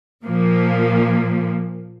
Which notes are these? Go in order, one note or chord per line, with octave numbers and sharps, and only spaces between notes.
A#2 F3 A#3